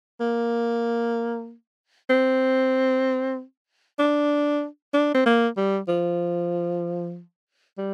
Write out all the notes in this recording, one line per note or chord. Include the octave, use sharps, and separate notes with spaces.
A#3
C4
D4
D4
C4
A#3
G3
F3
G3